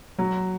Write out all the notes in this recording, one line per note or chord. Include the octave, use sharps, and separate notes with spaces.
F#3